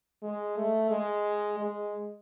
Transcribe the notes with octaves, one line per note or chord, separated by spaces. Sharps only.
G#3
A3
G#3
G#3